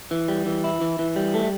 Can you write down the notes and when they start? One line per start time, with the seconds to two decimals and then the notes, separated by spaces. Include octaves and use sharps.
0.11 E3
0.28 G3
0.46 E3
0.64 E4
0.81 E3
0.99 E3
1.16 G3
1.34 A3